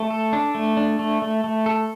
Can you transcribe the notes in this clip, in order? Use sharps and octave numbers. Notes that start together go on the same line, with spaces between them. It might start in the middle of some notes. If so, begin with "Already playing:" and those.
Already playing: A3
A4
D4
A3
D4
A3
A3
A3
A4